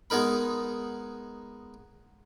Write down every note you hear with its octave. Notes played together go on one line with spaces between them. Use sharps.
G#3 B3 D#4 A#4 B5